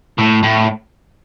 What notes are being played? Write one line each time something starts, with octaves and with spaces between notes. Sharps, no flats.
A2
A2